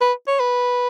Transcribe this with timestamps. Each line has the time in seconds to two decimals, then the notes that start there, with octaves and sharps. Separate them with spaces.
0.01 B4
0.27 C#5
0.40 B4